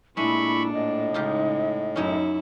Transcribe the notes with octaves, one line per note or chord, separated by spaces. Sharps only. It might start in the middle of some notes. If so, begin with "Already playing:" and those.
A#2 G#3 A3 D4 E4 B5 C#6
A2 D#5
C#3 G#3 D#4 F4 G4
F#2 C#4 D#4 E4 C#5